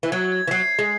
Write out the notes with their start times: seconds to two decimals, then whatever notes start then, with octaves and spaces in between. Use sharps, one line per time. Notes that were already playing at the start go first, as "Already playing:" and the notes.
0.03 E3
0.12 F#3 G#6
0.32 G#6
0.47 E3
0.51 F#3 C7
0.71 C7
0.79 G#3